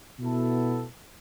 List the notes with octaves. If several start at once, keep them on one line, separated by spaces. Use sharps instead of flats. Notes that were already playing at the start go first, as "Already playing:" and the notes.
B2 B3 E4 A4